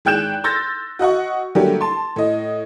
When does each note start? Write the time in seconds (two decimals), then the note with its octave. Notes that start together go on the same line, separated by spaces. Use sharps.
0.05 G#1 G#4 G5 F#6 G6 E7
0.44 C6 E6 G6 A6 A#6
0.99 F#4 D#5 F#5 C#6
1.55 D3 F#3 G3 A3 A#3 G4
1.81 A5 C6
2.16 A2 D#5